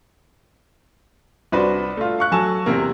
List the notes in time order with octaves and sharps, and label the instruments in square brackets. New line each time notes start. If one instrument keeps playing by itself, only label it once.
[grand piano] C2 D4 F#4 B4 C5
A3 F4
F5 C#6 F#6
F#3 A4 G#5 A5 C#6 E7
E2 C3 A#3